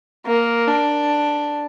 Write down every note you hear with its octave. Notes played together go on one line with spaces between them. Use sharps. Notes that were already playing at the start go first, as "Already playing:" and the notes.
A#3
D4